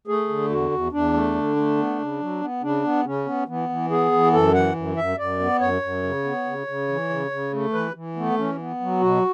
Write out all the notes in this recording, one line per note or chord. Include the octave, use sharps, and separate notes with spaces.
A3 G#4
D3
E2 F#4
E2
E2 D4
A3
D3
A3
B3
C#3
F#3
B3
C#3 D4
B3
C#3 C#4
B3
E3 B3
E3
B3 G#4
E3
F#2 A4
E3 F#5
F#2
F#2 E5
F#2 D5
B3
F#2 C#5
F#2
C#3
B3
C#3
C#3
E3
C#3
C#3
A3
E3 B4
E3
A3 B3
E3 C#4
B3
F#3
B2 F#4